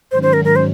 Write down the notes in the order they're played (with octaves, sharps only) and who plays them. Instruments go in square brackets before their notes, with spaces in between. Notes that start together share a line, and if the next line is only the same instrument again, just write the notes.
[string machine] G#2 D#3 F#3 C#4 [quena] C5
[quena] C5
A#4
A#4
C5